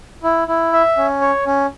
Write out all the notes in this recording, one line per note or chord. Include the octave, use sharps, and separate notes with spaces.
E4
E4
E5
C#4
C#5
C#4